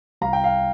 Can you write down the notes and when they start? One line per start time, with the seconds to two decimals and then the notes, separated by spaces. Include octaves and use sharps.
0.21 C2 F5 A#5
0.33 G5
0.44 F5